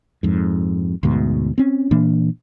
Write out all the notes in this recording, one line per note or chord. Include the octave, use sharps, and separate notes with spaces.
F2 G#2
D2 G#2 B2
C4 C#4
A#2 E3 A#3 D4